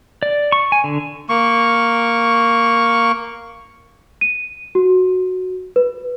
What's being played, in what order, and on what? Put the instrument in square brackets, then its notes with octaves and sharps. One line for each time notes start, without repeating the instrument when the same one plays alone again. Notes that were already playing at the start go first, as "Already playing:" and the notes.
[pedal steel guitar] D5
C#6
G#5
D3
[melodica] A#3 C#6
[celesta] D#7
F#4
B4